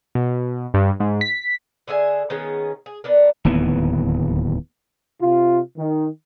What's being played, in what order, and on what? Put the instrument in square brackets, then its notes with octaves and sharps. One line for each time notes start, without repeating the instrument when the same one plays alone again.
[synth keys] B2
G2
G#2
B6
[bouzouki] D3 G#4 E5 G#5
D#3 B3 C#4 G#4
G#4
B3 D4 A#4
[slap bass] D1 D#2 E3 B3
[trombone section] C3 F4
D#3